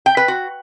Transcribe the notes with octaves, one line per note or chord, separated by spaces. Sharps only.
G5
B4
F#4